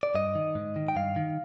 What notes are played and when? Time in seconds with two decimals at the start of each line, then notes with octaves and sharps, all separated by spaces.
0.03 D5
0.15 G2 D#5
0.35 D#3
0.55 G#2
0.76 D#3
0.88 G5
0.96 G2 F5
1.16 D#3